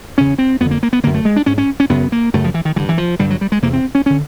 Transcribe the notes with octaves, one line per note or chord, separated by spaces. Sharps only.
E2 C#3 C#4
C4
F2 D3 B3
A#3
A#3
B3
F#2 D3 A#3
A3
G#3
D4
G#2 C#4
C#4
C#4
F#2 C#3 B3
A#3
F#2 C#3 A3
F3
E3
D#3
G2 D3 E3
E3
F3
G2 D3 G3
F#3
G3
G#3
E2 C3 A#3
C4
C#4
D3 C#4